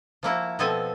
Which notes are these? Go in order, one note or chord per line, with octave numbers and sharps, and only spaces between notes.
F3 A#3 E4 F#4
B2 F3 B3 C4 A4 G#5